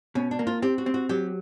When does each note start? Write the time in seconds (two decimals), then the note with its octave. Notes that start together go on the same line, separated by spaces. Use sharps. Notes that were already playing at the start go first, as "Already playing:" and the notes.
0.15 B2 C#4
0.31 D4
0.39 A#3
0.47 F4
0.62 C4 G4
0.78 F#4
0.86 C4
0.94 F#4
1.09 F#3 G4